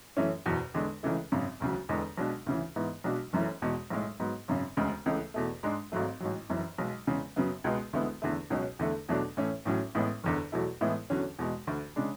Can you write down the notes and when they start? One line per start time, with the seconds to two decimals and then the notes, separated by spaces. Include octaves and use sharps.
0.17 F#2 E3 A3 C#4
0.46 F#1 E2 B2
0.74 E2 D3 G#3
1.03 C#2 C#3 E3 A3
1.32 G#1 F#2 C#3
1.60 E1 D2 C#3 F#3
1.89 E1 E2 D3 G#3 B3
2.18 B1 B2 G#3 D4
2.46 D2 C#3 E3
2.76 G#2 E3 B3
3.04 B1 B2 G#3 D4 F#4
3.33 F#1 F#2 E3 A3 C#4
3.62 E2 B2 G#3
3.90 B1 A2 G#3
4.20 G#2 F#3 B3
4.48 G#1 F#2 C#3
4.77 E1 D2 C#3 G#3
5.06 C#2 C#3 E3 A3
5.34 E2 B2 A3
5.63 G#2 G#3 D4
5.92 G#1 G#2 F#3 A3
6.20 A1 G#2 F#3
6.49 F#1 F#2 E3
6.78 B1 B2 G#3
7.07 E2 C#3 G#3
7.36 F#2 C#3 F#3 B3
7.64 C#2 B2 G#3 B3
7.93 D2 D3 G#3 B3 E4
8.22 E2 D3 A3
8.50 C#2 B2 F#3 C#4
8.79 E2 D3 A3
9.09 E2 B2 F#3 A3 D4
9.37 A2 E3 A3 C#4
9.65 A1 A2 F#3 C#4
9.95 A1 A2 G#3 B3
10.24 F#1 E2 D3
10.52 E2 B2 F#3 A3 E4
10.81 A2 E3 G#3 B3 E4
11.10 E2 D3 F#3 C#4
11.39 E2 B2 G#3
11.67 D2 D3 A3
11.96 C#3 G#3 D4